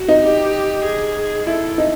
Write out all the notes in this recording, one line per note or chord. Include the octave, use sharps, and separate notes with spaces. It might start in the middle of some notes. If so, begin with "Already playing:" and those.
Already playing: F#4
D#4
G4
G#4
E4 A4
D#4